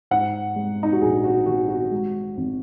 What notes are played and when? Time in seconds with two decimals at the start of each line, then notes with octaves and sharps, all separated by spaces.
0.11 G#2 F#5
0.56 G#3
0.83 D#4
0.93 F#4
1.01 A#1 G#4
1.24 F#4
1.46 D#3 F#4
1.69 F#4
1.92 G#3
2.37 G#1